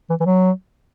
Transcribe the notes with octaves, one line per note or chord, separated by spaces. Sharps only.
E3
E3
F#3